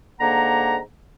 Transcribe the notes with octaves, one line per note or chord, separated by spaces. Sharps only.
G#2 D3 A#3 F#5 A#5